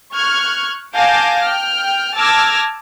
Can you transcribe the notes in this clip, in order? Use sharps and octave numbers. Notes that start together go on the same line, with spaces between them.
C#6 F6 F#6 G#6
F5 G#5 A5 D6 G6 A#6
G5 F6
A5 D6 E6 F6 G#6 A#6